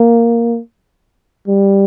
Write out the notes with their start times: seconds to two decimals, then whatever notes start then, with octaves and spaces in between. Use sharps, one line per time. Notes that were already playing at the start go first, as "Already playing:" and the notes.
Already playing: A#3
1.48 G3